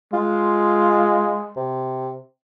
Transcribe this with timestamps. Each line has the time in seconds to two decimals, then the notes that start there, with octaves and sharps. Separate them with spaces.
0.13 G#3 F4
1.56 C3